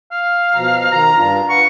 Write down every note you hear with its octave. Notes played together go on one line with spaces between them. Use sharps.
F5
B2 F3 A#5
D#3 A#5
G2 D4 F4
B4 F5 F#5 C#6